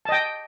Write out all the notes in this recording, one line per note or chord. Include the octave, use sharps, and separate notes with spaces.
D#5 G5 A5